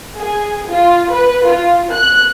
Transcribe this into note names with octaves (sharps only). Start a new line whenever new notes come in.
G#4
F4
B4
F4
F#6